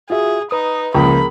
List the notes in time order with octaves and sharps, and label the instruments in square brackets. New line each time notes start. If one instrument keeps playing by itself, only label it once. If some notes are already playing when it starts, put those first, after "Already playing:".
[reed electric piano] F4 F#4 E5 [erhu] G#4
[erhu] D#4 [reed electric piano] B4 D#6
[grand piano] C#2 F3 A#3 [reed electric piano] G#4 A#4 A#5 [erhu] B5